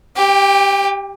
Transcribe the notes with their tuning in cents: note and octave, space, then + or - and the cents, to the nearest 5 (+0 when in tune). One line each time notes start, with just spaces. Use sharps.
G4 +0 G5 +35